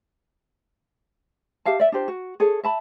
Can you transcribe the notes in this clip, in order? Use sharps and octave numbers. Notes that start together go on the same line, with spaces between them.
G4 E5 F5 A5
D5 E5
D4 F4 G4 C5
F#4
G#4 A4 C#5
E5 A5 B5